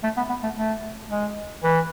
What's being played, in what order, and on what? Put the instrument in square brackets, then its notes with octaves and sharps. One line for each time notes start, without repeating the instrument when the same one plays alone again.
[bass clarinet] A3
B3
B3
A3
A3
G#3
E3